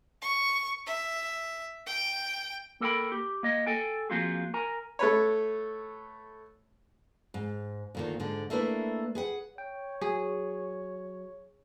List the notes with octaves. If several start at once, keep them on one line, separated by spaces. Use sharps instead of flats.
C#6
E5
G5
A#3 A4 A#4 F#5 G5 B5
G4
A#3 D#5
A4 G5 G#5
F3 A#3 C4 F4 F#4 G#4
A#4 G#5 A#5
A3 B4 C#5
G#2
D2 A#2 D#3
G#2 D3
A3 A#3 D4 E4 B4
G#4 B4 F#5
C#5 G5
F#3 G#4